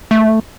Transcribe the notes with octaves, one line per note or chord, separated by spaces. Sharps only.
A3